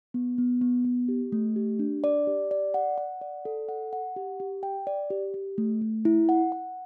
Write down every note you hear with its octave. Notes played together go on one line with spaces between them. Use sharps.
B3
B3
B3
B3
G4
A3
G4
D4
D5
G4
D5
F#5
F#5
D5
A4
F#5
F#5
G4
G4
G5
D5
G4
G4
A3
A3
E4
F#5
F#5